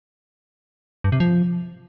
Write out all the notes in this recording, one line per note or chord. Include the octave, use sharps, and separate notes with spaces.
G2
C3
F3